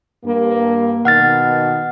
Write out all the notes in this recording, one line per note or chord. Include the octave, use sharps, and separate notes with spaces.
G2 A#3
B2 D#3 F#5 F6 A6